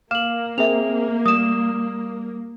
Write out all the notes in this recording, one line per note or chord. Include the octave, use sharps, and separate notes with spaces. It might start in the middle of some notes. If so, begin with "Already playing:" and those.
A#3 F5 D6 F6 E7 F#7
C4 G#4 A#4 E5 F7
G3 D#6 E7